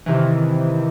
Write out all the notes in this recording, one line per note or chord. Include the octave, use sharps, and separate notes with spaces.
C3 D#3 E3